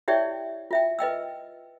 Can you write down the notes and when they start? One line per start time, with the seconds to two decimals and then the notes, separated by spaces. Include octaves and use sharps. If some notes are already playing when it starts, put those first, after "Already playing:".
0.08 E4 G4 C#5 D5 E5 G5
0.71 F4 E5 G5
0.99 B4 D#5 G5 E6